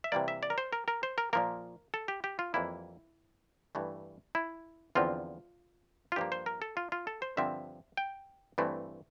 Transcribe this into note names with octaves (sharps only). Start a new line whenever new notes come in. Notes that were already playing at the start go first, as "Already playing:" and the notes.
E5
C3 E3 G3 A#3 D5
E5
D5
A#4
C5
A#4
A#4
C5
A#4
A#2 F3 A#3 A#4
A4
G4
G4
F4
F2 E3 G3 A#3 E4
G2 E3 A3
E4
E2 D3 F3 C4 F4
F4
G2 F3 A#3 G4
C5
A#4
A4
F4
F4
A4
C5
G2 D3 F3 C4 E5
G5
G2 E3 A3 C4